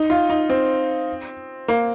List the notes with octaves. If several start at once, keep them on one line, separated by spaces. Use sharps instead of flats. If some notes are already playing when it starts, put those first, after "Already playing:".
Already playing: D#4
F4
D#4
C4
A#3